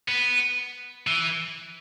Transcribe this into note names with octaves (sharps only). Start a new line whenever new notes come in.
B3
E3